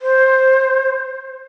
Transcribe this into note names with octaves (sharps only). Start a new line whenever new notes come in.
C5